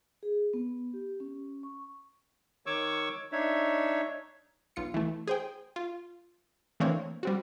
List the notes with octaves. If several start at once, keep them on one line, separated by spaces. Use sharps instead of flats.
G#4
B3
G4
C#4
C#6
D#3 C#5 C#6 D6 E6
D4 D#4 C#5 E5
B1 F4 C#7
E3 A3
G#4 C5 G5
F4
E3 A3 A#3 C4 D4 C#5
G3 C4 F#4